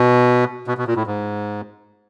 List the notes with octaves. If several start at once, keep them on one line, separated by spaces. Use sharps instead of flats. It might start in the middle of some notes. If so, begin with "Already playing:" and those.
Already playing: B2
B2
B2
A#2
A2
G#2